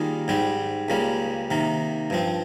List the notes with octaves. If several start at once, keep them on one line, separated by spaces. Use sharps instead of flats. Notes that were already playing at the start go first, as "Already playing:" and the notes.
Already playing: D#3 G3 A#3 F4 G#4
G#2 G3 C4
C#2 C#3 G3 A#3
C3 D#3 A#3
G2 F3 C4